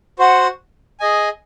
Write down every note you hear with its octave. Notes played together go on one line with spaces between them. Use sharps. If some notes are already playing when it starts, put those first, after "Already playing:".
F#4 C5 F#5
G#4 D#5 G#5